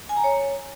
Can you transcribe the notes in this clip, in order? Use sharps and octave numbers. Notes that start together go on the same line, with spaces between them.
G#5
A#5
C#5